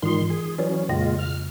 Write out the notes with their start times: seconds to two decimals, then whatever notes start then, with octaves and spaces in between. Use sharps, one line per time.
0.02 G#2 D#3 E3 F4 C6
0.30 G#4
0.58 E3 F#3 C#4 B4 C#5 D5
0.89 F2 A#2 C#3 G#3 F4 A#6
1.19 F6